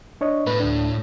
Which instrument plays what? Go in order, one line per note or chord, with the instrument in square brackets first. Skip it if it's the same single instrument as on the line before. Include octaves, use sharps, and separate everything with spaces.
[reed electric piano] D4 C#5 D#5
[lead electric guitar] A2 [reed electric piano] B4
[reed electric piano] D2 D4